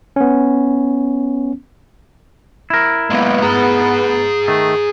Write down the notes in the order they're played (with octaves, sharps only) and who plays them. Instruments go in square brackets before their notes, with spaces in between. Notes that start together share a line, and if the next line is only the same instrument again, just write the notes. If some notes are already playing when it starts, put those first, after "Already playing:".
[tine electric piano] B3 C#4
[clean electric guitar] E4 A#4
[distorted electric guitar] G#3 A#3 [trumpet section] B3
[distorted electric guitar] G#4 A#5
[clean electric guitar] D#3 A3